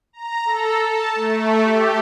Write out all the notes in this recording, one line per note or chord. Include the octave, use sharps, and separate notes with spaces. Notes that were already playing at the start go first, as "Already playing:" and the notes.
A#5
A4
A5
A3
G4